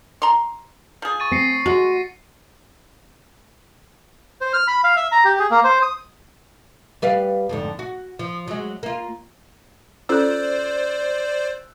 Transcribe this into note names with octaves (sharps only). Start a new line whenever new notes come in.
A#5 C6
F3 G#4
C#6 A6 D#7
C4 A#6 C7 C#7
G#3 F#4
C5
F6
B5
F5
E5
A#5
G4
G#4
A#3
C5
D#6
G3 B4 F5
F2 G#2 D3
F#4
F3
F#3 G#3
A#3 F4
C#4 F4 A4 C5 D5 E6 F#6